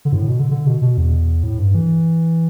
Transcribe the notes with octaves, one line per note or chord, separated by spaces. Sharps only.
D3
G2
A2
B2
D3
D3
B2
B2
E2
A2
G2
E3